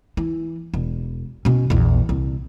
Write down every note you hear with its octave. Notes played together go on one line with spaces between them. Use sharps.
E3
E1
B2 C#4
A#1 E2
C2